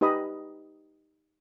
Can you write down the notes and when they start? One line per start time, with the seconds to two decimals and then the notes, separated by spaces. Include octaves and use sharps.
0.01 D#4 G4 B4 D#5 B5 D#6